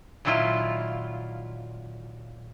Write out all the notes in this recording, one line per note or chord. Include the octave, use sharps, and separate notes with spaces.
A#2 D#3 F#3 E4 F4